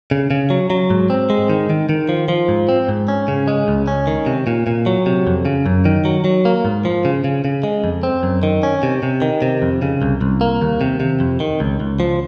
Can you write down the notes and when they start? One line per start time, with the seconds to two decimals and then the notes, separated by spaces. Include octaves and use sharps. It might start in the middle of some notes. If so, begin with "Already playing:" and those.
0.11 C#3
0.31 C#3
0.50 F#3
0.70 F#3
0.90 G#2
1.10 C4
1.30 G#3
1.50 D#3
1.70 D#3
1.89 D#3
2.09 F3
2.28 F3
2.48 G#2
2.69 C4
2.88 G#2
3.08 C#4
3.28 C#3
3.48 G#3
3.68 C#2
3.88 C#4
4.07 D#3
4.26 C3
4.47 A#2
4.67 A#2
4.86 F#3
5.06 C3
5.27 F2
5.45 C#3
5.66 F#2
5.85 D#3
6.05 F#3
6.24 F#3
6.45 A#3
6.65 G#2
6.85 F3
7.05 C#3
7.24 C#3
7.45 C#3
7.63 G#3
7.84 F2
8.03 C4
8.23 F#2
8.43 D#3
8.63 C#4
8.83 C3
9.03 C3
9.22 D#3
9.42 C3
9.62 F2
9.82 C#3
10.02 C2
10.21 C2
10.41 A#3
10.61 D#2
10.81 C3
11.00 C3
11.20 F2
11.40 D#3
11.60 C#2
11.80 C#2
12.00 F3